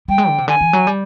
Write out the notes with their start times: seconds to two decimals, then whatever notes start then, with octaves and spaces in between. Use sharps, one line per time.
0.08 G3 G5
0.18 G#3
0.28 D3
0.38 C3
0.48 D3 G#5
0.61 E3
0.73 F#3
0.87 G3